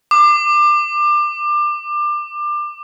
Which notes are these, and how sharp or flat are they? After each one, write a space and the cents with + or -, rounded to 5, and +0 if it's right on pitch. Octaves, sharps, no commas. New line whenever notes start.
D6 +25